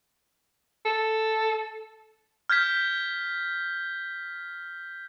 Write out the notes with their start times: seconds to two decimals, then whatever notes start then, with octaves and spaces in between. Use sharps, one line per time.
0.85 A4
2.50 F6 G6 G#6 B6